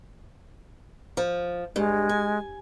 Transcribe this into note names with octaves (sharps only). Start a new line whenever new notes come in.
F3
G2 G#3
G#5